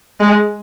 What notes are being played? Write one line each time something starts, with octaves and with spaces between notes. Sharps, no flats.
G#3